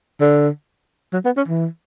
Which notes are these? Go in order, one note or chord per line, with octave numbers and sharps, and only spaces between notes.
D3
F#3
B3
C#4
E3